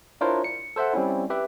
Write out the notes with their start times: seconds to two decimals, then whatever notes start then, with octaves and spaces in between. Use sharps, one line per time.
0.21 D4 E4 F4 A#4 C5 C#5
0.44 C#7
0.76 A4 C5 E5 F#5
0.94 G3 C4 C#4 E4
1.30 G4 B4 E5